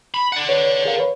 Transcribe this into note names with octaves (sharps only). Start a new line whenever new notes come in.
B5
D5 F#5
B4 C#5
G#4 A#4 F5
B4 C#5